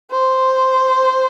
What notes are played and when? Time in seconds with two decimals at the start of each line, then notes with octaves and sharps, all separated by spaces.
0.11 C5